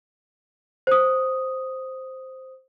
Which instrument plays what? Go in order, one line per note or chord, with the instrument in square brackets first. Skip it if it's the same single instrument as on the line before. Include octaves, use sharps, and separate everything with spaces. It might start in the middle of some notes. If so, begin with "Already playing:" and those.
[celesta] C5 D#6